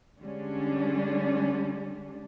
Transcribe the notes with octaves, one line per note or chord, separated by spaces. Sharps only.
D3 G3 G#3 C#4 D4